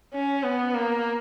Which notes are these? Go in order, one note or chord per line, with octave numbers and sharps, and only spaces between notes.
C#4
B3
A#3